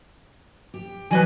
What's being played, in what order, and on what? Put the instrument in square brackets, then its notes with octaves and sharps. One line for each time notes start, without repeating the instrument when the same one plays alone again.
[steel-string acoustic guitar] G4
[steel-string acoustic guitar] E3 F#3 G3 [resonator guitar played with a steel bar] B4 D#5 G#5